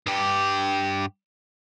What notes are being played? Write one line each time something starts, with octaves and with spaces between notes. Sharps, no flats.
G2 G4